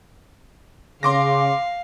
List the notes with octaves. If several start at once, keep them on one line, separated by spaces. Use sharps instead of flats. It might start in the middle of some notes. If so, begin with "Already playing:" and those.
C#3 F5 C6 D6 A#6